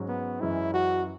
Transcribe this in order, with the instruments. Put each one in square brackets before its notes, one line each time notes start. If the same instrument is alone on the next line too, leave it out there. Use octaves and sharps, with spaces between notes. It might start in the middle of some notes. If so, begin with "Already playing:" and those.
Already playing: [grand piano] G#2 F#3 C#4
[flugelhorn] B3
[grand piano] F#2 E3 G#3 C#4 [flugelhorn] E4
[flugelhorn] F#4